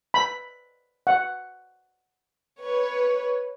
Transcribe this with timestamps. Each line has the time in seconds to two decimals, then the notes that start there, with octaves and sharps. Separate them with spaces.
0.14 B5
1.07 F#5
2.60 B4 C#5